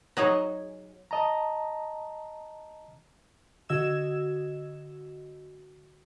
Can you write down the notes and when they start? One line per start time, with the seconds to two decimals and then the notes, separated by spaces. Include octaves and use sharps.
0.17 F#3 D#4 G#4
1.11 D#5 A5 A#5
3.69 D3 F#4 D#5 E6 G#6 E7